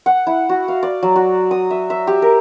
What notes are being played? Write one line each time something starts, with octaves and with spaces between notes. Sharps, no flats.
F#5
E4
F#4
F5
D5
F#3
F#4
D#6
E5
E5
G4
A#4